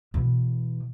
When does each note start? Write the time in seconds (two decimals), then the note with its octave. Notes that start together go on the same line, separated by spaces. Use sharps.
0.14 B2 E3